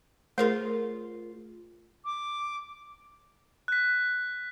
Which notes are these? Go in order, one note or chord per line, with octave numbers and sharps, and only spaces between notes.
A3 F4 G#4 A#4 C5
D6
F#6 B6